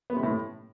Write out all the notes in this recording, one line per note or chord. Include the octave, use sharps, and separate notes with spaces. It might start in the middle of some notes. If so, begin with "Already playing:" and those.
B3
C3
A2